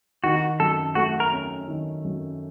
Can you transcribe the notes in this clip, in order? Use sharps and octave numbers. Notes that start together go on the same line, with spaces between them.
D#3 F#4
F#2 A4
A3 F#4
A#4
C#4
D#3
F#2